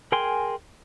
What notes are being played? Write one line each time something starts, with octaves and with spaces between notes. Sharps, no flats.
G#4 A#4 G5 G#5 C6